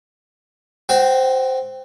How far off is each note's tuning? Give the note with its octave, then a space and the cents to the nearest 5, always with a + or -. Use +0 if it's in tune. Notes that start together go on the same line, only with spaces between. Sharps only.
C4 -5 F#4 +25